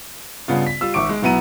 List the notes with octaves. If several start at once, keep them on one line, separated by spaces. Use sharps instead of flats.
G2 C#3 B3 F4
B6
G3 F4 E6
G#1 E5 C#6 D6 D7
G#3
B1 B2 B3 E4 A#5 D#7